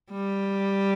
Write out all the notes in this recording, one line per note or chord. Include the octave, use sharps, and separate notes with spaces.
G3